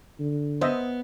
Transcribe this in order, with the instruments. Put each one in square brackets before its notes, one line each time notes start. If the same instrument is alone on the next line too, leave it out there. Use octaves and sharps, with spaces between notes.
[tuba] D3
[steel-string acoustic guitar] B3 [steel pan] C5 D#5 E5